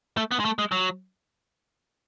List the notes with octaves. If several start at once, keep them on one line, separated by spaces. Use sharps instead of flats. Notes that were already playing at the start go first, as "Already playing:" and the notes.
A3
B3
G#3
A3
G#3
F#3